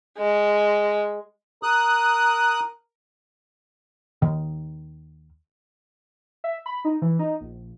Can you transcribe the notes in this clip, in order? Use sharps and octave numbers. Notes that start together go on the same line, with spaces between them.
G#3
A#4 D#6 F#6
D#2 D#3
E5
B5
D#4
E3
D#4
A#1